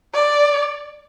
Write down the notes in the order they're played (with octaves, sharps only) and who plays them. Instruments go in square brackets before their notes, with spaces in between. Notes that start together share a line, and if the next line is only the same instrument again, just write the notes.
[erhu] D5